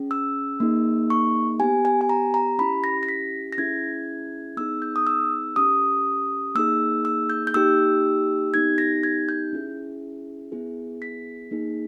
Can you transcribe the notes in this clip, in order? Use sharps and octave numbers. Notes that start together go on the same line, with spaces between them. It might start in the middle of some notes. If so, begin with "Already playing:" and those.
Already playing: C#4 G#4
E6
A#3 D#4 G#4
C#6
B3 G4 G#5
G#5
G#5
A#5
A#5
C#4 E4 G4 B5
A#6
A#6
B6
A#6
C#4 E4 G#4 G#6
B3 D#4 G#4 E6
G6
D#6
E6
C#4 G4 D#6
A#3 D#4 G#4 E6
E6
G6
G6
A#3 D#4 G4 E6
B3 D#4 G4 G#6
A#6
G#6
G6
C#4 E4 G#4
B3 E4 G#4
B6
A#3 D#4 G#4